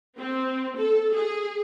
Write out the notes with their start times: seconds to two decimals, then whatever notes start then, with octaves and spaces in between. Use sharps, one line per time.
0.18 C4
0.78 A4
1.14 G#4